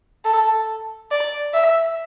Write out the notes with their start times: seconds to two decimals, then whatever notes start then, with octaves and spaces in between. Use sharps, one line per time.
0.25 A4
1.11 D5
1.54 E5